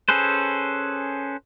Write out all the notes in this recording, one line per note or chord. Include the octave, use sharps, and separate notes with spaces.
C#4 G#4 A4 B4 C5